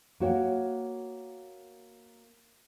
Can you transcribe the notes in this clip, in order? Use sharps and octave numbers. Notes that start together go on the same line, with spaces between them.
A#3 F#4 C#5 G5